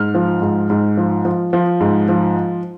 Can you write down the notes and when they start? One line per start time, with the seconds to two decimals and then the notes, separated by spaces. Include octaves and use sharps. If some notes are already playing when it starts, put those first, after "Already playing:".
Already playing: G#2 F6
0.14 F3
0.42 G#2
0.70 G#2
0.97 F3
1.25 F3
1.53 F3
1.80 G#2
2.08 F3